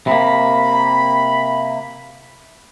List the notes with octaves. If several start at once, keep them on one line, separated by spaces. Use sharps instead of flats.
C3 A#3 B5